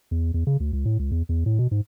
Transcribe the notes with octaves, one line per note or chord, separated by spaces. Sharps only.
E2
E2
C#3
D2
C#2
A2
C#2
E2
E2
A2
B2
G#2